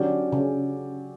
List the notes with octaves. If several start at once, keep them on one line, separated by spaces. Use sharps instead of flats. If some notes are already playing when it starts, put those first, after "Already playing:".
Already playing: D3 F#3 C#4 G4 D5
C#3